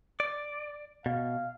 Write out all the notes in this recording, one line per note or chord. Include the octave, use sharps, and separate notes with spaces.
D5
B2 F5